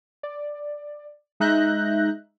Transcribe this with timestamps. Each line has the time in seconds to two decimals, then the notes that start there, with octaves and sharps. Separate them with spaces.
0.23 D5
1.40 G#3 D#4 E5 F#6 G6 A#6